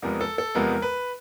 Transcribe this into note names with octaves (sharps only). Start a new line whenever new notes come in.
E2 C3 F3 G#3 B3 A#4
A4
A4
E2 C3 F3 G#3 B3 A#4
B4